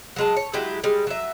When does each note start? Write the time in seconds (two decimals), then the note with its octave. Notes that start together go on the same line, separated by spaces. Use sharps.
0.16 F#3 G#3 A5
0.37 C#5
0.53 F#3 G#3 E4 G4
0.84 G3 G#3
1.07 F#3 E5